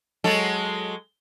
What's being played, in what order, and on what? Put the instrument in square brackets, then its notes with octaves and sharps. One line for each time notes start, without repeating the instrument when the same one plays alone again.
[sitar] F#3 G#3 A4